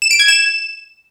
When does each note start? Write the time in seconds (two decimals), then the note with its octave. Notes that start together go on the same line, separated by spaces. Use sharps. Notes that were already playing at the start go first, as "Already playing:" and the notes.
0.02 E7
0.11 D7
0.20 G#6
0.28 E7